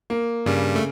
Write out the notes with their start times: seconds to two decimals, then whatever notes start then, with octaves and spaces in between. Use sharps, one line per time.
0.10 A#3
0.46 G2 C#3 G3
0.76 A3